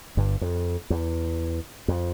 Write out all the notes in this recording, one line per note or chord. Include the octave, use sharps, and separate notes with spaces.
G1 G2
F2
E2
F2